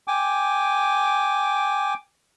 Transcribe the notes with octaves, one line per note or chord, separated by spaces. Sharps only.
G5 G#5 D6